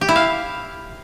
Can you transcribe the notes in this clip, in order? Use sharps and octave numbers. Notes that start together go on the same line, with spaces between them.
G4
E4
F5